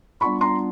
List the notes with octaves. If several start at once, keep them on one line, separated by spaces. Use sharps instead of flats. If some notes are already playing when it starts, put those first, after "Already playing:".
G3 B3 D4 F4 B5 C#6
A#5 C6